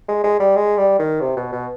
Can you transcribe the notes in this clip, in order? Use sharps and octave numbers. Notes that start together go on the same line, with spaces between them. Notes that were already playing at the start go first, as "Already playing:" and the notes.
G#3
G#3
G3
G#3
G3
D#3
C3
B2
B2